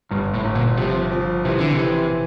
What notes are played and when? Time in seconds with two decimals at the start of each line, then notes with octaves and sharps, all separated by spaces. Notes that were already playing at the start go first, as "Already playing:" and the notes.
0.11 G1 G2
0.34 A2
0.45 G1
0.55 A#2
0.77 C3 F3
1.12 F3
1.45 C3 E3
1.59 D3
1.71 C3
1.78 E3